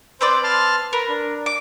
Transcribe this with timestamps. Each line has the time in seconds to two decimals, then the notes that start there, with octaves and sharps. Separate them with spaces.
0.21 C4 B4 C5 D5
0.44 A5 C6 F6
0.93 A#4 B4
1.09 D4
1.46 D6